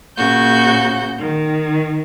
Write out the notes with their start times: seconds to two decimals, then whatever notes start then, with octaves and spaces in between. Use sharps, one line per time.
0.17 A#2 C#3 F#4 G6
1.18 D#3